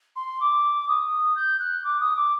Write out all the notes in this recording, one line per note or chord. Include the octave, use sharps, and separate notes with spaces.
C6
D6
D#6
G6
F#6
D6
D#6
D6